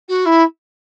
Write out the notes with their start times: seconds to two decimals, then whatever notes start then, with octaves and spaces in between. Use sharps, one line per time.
0.08 F#4
0.25 E4